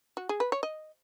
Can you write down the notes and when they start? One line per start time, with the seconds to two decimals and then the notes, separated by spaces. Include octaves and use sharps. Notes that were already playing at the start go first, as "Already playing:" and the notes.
0.17 F#4
0.29 G#4
0.40 B4
0.52 C#5
0.63 D#5